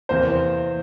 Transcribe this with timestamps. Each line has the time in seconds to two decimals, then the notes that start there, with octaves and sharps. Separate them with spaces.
0.09 E2 C3 E3 A#3 C5